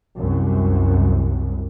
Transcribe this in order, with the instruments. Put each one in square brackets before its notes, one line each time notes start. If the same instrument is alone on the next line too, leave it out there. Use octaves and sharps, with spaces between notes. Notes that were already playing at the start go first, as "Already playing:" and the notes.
[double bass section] C2 F#2